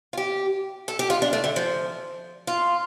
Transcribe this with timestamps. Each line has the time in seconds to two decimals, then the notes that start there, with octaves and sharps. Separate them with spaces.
0.13 F4
0.17 G4
0.88 A4
0.99 G4
1.10 F4
1.22 D4
1.33 A3
1.44 D3
1.56 F3
2.47 F4